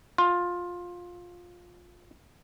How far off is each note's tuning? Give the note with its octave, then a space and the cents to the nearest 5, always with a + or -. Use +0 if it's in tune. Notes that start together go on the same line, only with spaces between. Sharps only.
F4 +15